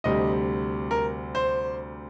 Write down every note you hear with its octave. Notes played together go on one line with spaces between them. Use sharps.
D2 C3 G3 D#5
A#4
C5